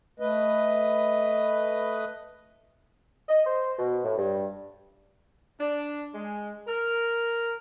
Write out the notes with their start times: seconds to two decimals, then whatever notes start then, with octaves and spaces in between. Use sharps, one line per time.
0.20 A3 B4 D#5
3.29 D#5
3.46 C5
3.79 B2
4.05 A2
4.18 G2
5.59 D4
6.13 G#3
6.67 A#4